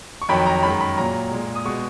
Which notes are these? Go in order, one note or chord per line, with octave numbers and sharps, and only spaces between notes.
C#6
F2 D#3 F#3 B5
A#5
F#2 D#3 G#3 B5
B5
A#2 F#3 A#5
A#2 G#3
D#6
B2 G#3 C#6